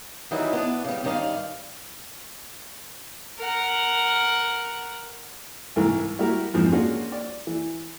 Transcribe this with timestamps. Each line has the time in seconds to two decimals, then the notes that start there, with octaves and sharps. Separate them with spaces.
0.31 D#3 E3 F#3 G3 D#4 E4
0.53 B3 D4 A5
0.85 C#3 G3
1.04 G2 D#3 C#4 D5 D#5 F5
3.38 A#4 F#5
5.76 C2 G#2 E3 A#4
6.19 G3 E4 F#4 G4 A#4
6.54 F2 G#2 E3 F3
6.72 G#3 A#3 C#4 D4 F4 F#4
7.12 D5
7.47 E3